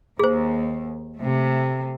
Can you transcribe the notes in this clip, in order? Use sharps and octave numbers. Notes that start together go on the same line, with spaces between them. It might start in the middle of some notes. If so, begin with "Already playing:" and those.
D#2 G#4 C5
C3 A3